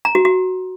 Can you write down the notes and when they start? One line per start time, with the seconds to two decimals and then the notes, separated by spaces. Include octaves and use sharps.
0.05 A#5
0.15 F#4
0.25 F#4